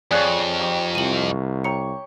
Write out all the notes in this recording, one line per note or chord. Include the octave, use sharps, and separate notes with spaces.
F2 G#4 C#5 D5 F#6
D#4 G4
C2 D#7 F#7
C#5 G5 A#5 C#6 C#7